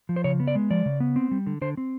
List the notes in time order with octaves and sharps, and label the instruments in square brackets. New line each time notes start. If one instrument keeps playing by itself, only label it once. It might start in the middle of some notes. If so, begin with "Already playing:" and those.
[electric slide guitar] F3
C5
C#3 C#5
B3
D5
G#3
F3 D5
C#3
B3
C4
G3
D3
D3 C5
C4